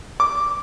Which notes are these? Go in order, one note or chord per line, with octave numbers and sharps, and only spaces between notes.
D6